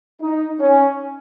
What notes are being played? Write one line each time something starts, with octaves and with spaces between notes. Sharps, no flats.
D#4
C#4